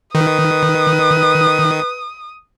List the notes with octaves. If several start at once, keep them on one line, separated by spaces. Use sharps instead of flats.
D#3 B4 D#6